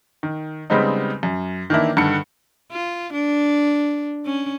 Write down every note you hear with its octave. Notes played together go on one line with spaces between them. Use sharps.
D#3
C#3 G3 G#3 B3 C4 D#4
F#2
D#3 E3 A#3 D4 E4
G2 D3 D#3 C#7
F4
D4
C#4